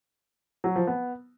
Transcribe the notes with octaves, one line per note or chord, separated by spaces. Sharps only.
F#3
F3
B3